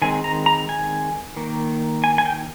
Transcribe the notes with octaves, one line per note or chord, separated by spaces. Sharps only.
D#3 G#3 C4 G#5
A#5
A#5
G#5
D#3 A#3
G#5
G#5
G5